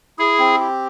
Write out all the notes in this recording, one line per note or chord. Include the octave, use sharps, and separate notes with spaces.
E4 G#4
C4
G4